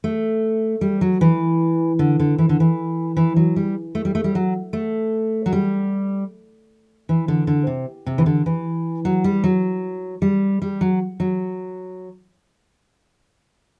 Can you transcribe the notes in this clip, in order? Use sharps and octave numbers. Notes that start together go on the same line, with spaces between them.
A3
G3
F#3
E3
D3
D3
E3
D3
E3
E3
F#3
G3
A3
G3
A3
G3
F#3
A3
F#3
G3
E3
D3
D3
C3
C3
E3
D3
E3
F#3
G3
F#3
G3
G3
F#3
F#3